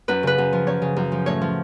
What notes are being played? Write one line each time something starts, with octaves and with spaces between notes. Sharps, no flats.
F#2 B4
C#3 B4
F#2
F3
F#2 C#5
C#3
F#2
F3
A2 C#5
F3